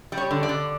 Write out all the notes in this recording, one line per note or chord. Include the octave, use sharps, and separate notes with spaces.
G3
C#5
D3
D5
D3